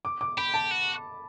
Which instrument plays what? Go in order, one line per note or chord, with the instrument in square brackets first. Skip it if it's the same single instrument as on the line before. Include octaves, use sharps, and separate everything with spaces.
[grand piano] D6
D6
[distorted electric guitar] G4 [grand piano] B5
[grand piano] A5
[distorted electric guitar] F#4